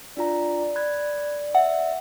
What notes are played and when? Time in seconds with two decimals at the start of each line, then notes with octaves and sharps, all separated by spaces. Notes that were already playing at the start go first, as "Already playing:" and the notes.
0.17 D4 F4 D5 A#5
0.76 B5 F#6 G#6
1.55 E5 F#5